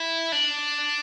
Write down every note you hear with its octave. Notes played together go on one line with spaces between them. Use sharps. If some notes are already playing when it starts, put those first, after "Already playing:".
Already playing: E4
D4